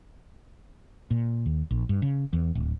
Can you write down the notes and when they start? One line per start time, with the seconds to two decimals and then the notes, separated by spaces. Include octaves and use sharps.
1.11 A#2
1.46 D#2
1.71 A#1
1.89 G2
2.02 C#3
2.33 E2
2.55 D1